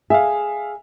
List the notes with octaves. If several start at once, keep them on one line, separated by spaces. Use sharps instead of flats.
G#4 E5 F5